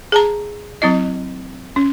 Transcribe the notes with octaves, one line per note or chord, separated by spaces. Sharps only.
G#4 A5 A#5
F#3 C4 E4 D#5
C#4